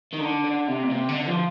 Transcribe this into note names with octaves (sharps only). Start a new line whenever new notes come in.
D#3
D3
D3
C3
A#2
C3
D3
F3